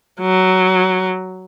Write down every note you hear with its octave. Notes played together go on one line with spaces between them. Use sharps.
F#3